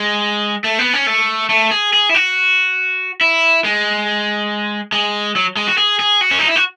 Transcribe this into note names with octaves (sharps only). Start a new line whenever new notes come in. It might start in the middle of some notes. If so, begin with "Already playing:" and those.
Already playing: G#3
A3
B3
C#4
A3
A3
G#4
G#4
E4
F#4
E4
G#3
G#3
F#3
G#3
F#4
G#4
G#4
F#4
C#4
D#4
E4
F#4